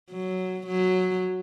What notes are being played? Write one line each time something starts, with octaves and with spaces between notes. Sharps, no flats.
F#3
F#3